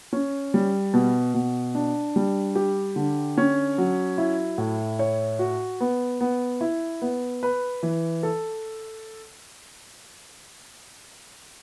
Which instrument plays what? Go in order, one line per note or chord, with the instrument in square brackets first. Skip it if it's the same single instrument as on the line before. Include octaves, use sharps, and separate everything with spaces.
[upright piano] C#4
G3
B2
B2
D4
G3
G4
D3
C#4
F#3
E4
A2
C#5
F#4
B3
B3
E4
B3
B4
E3
A4